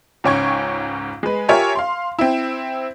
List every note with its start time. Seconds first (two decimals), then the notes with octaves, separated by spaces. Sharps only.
0.24 C#2 G#2 C#4 G5 C#6 G#6
1.23 G#3 B4
1.49 F4 G4 A#4 C#5 E5 G#5
1.76 F5 C6
2.19 C4 E4